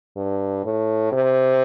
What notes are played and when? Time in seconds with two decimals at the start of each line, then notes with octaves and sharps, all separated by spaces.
0.16 G2
0.65 A2
1.12 C3